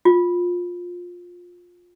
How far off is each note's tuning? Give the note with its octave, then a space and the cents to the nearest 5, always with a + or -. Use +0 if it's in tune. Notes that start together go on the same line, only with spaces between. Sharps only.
F4 +20